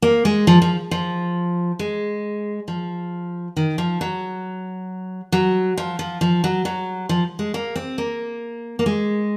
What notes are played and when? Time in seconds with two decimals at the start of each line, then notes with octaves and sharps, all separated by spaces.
0.02 A#3
0.25 G#3
0.47 F3
0.62 F3
0.91 F3
1.79 G#3
2.68 F3
3.56 D#3
3.78 F3
4.01 F#3
5.32 F#3
5.78 F3
5.99 F3
6.21 F3
6.44 F#3
6.65 F#3
7.09 F3
7.39 G#3
7.54 A#3
7.76 C4
7.98 A#3
8.79 A#3
8.86 G#3